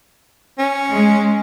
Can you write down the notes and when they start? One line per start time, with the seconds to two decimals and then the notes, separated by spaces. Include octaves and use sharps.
0.59 C#4
0.90 G#3